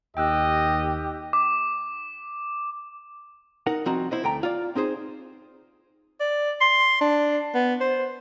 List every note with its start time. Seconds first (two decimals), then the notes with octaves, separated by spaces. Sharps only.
0.17 D#2 G4 D#5 G5 E6 F#6
1.33 D6
3.67 D#4 A#4 F#5
3.85 C2 F3 C4 F#4 D#5 A#5
4.11 E4 C5 D#5
4.23 D2 A3 G5 A#5
4.43 F4 D5
4.75 C4 D#4 G#4 C5
6.20 D5
6.61 C6
7.01 D4
7.55 B3
7.80 C5